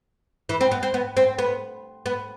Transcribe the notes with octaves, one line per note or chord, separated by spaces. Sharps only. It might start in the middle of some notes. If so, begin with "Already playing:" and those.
E3
C4
B3
C4
B3
C4
B3
B3